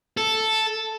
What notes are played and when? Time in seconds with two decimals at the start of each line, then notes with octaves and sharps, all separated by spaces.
0.17 A4